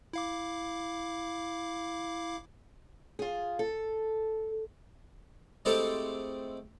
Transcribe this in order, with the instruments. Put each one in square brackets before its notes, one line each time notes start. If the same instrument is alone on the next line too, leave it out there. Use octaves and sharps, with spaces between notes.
[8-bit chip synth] E4 F5 D6
[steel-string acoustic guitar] F4 G#4
A4
[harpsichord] G#3 A3 C4 E4 G4 A4